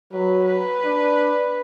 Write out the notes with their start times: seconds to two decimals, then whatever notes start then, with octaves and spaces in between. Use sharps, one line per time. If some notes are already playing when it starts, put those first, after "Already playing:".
0.12 F#3 B4
0.44 B4
0.85 D4